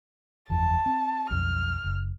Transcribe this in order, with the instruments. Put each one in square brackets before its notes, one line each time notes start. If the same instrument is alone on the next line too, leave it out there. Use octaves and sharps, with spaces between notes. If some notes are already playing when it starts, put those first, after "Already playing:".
[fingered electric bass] F#1 E2 F3 [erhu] A5
[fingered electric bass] C4
[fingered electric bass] B1 F2 [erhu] F6
[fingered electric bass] F#1